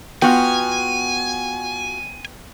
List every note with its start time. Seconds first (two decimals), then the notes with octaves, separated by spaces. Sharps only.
0.22 B3 F4 F#4 G5 G#5